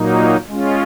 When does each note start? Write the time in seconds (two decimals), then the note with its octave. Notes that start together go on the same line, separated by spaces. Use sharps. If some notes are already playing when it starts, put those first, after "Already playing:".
Already playing: A#2 F#3 A#3 D#4
0.48 G#3 C#4 F4